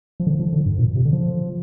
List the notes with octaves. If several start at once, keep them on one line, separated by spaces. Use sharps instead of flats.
F3
D3
F3
D3
G2
A#2
C3
D3
F3